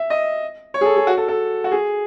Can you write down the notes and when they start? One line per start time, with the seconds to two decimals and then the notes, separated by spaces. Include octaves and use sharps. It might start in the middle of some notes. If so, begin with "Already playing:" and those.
Already playing: E5
0.10 D#5
0.74 C#5
0.81 G#4
0.85 A4
0.97 G#4
1.07 F#4
1.17 A4
1.28 A4
1.64 F#4
1.72 G#4